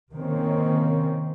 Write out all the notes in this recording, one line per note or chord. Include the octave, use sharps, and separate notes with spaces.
C3 D#3 A#3 C4 C#4